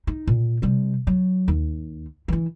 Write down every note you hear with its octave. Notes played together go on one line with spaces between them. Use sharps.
D#4
A#2
C3 G3
F#3
D#2
E3 E4